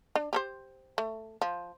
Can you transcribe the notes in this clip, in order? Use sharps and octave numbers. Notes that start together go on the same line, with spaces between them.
D4
G4 A4 C5
A3
F3